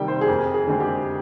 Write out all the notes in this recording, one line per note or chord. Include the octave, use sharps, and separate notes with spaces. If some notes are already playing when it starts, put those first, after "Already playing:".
Already playing: C3 D#3 G3 G5
C5
G#4
F2 A#4
G#4
D3 G#3 C4
G4